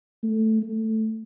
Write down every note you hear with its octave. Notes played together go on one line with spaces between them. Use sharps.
A3
A3